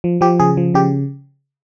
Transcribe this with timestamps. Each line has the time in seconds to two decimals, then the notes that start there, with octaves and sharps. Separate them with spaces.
0.04 F3
0.21 F3 G4
0.39 C#3 G#4
0.57 F3
0.74 C#3 G4